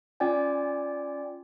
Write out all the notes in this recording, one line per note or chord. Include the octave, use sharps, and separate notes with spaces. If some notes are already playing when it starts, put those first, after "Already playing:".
C#4 F4 D5 G5 G#5